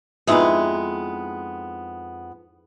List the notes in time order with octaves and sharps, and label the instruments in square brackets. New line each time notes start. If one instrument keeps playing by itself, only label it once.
[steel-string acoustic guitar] F2 G#3 B3 [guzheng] D#4 E4 G#4